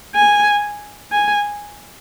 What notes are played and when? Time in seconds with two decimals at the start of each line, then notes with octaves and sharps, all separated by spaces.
0.15 G#5
1.12 G#5